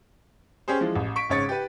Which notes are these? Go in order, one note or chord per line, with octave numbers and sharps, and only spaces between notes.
C#4 G4 G#4 C5
E3 F3 G#3
A1
C#6 B6 D7
G#1 C#3 C#5 A6 C#7
G4 B4